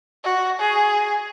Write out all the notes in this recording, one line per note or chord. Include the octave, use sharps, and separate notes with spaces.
F#4
G#4